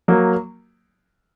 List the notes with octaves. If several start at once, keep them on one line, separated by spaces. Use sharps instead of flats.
F#3 A#3